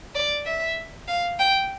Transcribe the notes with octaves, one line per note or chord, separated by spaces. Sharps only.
D5
E5
F5
G5